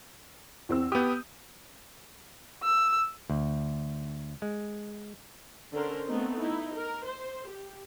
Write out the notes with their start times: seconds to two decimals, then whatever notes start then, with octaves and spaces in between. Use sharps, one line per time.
0.69 E2 C4 E6
0.92 B3 G4 D#6 G6
2.63 E6
3.30 D2
4.42 G#3
5.72 D3 C#4 A#4 C5
6.06 A3 B3 C4 D#4
6.40 D#4 E4
6.75 A#4
7.06 C5
7.48 G4